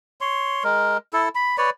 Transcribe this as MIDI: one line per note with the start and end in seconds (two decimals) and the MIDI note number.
0.21 0.63 73
0.21 0.63 84
0.64 0.97 56
0.64 0.97 70
1.13 1.29 64
1.13 1.29 69
1.35 1.56 83
1.58 1.70 71
1.58 1.70 73
1.58 1.70 74